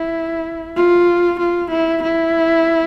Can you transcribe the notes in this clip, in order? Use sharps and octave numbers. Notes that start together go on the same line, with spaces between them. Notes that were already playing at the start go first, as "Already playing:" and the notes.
Already playing: E4
F4
F4
E4
E4